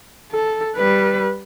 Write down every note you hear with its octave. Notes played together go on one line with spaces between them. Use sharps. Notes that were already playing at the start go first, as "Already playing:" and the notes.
A4
G3 B4